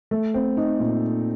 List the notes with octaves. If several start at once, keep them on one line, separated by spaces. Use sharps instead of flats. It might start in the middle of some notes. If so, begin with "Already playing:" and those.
A3
C4
D#4
A#2